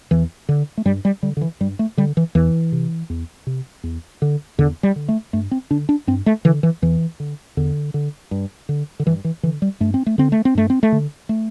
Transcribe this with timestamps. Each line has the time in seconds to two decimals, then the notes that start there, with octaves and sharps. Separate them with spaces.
0.11 E2 E3
0.49 D3
0.77 A3
0.85 G2 G3
1.05 G3
1.23 D3 G3
1.37 D3
1.41 E3
1.60 G2 G3
1.79 A3
1.97 D3 G3
2.17 E3
2.35 E2 E3
2.72 C3
3.10 E2
3.47 C3
3.83 E2
4.22 D3
4.58 E2 D3
4.83 G3
4.96 D3
5.08 A3
5.33 G2 A3
5.51 C4
5.71 D3 D4
5.89 D4
6.07 G2 C4
6.26 A3
6.45 D3 E3
6.63 E3
6.82 E2 E3
7.20 D3
7.57 E2 D3
7.94 D3
8.31 G2
8.69 D3
9.00 D3
9.06 G2 E3
9.24 E3
9.43 D3 E3
9.62 G3
9.80 G2 A3
9.94 C4
10.06 A3
10.18 D3 C4
10.32 A3
10.45 C4
10.55 G2 A3
10.70 C4
10.83 A3
10.92 D3
11.29 A3